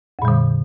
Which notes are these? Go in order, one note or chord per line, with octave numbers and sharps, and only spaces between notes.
F2 A#2 D3 G3